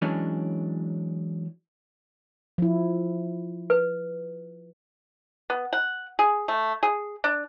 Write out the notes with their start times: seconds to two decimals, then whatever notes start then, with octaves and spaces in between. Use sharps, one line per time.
0.02 E3 F#3 G#3 C#4 D4
2.58 F3 E4
3.70 B4
5.50 B3
5.73 F#5
6.19 G#4
6.48 A3
6.83 G#4
7.24 D4